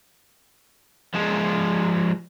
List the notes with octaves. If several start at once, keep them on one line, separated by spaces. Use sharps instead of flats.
F3 G#3